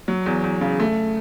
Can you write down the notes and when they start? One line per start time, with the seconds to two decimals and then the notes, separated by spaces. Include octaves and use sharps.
0.08 F#3
0.26 E2
0.44 E2
0.61 C#3
0.80 A3